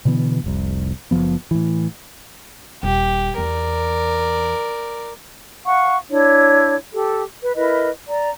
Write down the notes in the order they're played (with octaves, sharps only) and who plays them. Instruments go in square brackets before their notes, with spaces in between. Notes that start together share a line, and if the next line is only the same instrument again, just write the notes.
[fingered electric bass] B2 D3 E3 B3
F1 C2
F#1 E2 F3 B3
A2 E3
[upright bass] D#1 [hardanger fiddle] G4
[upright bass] E2 [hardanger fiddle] A#4 D5
[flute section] F5 F#5 C#6
D4 E4 C#5
G4 A4
B4
E4 A#4 B4 D#5
D5 A#5